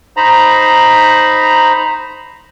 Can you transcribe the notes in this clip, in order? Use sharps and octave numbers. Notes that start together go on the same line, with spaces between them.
D#4 C5 A#5 B5